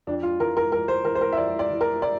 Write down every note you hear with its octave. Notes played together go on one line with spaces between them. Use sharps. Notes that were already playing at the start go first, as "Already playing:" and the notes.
F2 D4
F4
E3 A#4
A#4
F2 A#4
C5
E3 A#4
C5
A#4
E5
F2 D5
D5
E3
A#4
D5